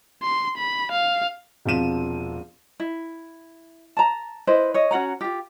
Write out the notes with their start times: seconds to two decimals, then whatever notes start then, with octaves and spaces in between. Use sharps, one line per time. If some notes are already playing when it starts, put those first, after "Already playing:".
0.22 C6
0.57 B5
0.92 F5
1.65 E1 C3 F3 F5 D#7 E7
2.80 E4
3.97 A5 A#5
4.47 E4 B4 C5 D#5
4.74 C#5 D#5
4.91 C#4 F#4 F#5 A#5
5.21 F4 G4